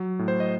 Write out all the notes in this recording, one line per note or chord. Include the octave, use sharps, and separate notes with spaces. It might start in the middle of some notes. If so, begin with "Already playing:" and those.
Already playing: F#3
A2
C5
D#5